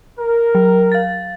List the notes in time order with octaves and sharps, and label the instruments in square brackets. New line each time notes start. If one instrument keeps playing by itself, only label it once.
[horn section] A#4
[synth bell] F#3
F5 A6